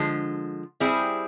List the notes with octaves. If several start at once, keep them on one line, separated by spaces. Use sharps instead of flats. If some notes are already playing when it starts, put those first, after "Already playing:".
Already playing: D3 F3 G#3
G3 C4 E4 G#4